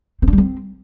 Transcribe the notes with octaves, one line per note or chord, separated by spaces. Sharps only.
C4
D4
G3
C4